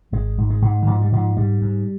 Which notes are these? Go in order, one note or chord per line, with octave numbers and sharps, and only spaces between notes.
G#1 G#3
G#2
G#3
G#2
D#3
G#2 F3
G3
G#2 F3
G#2 G3
G#2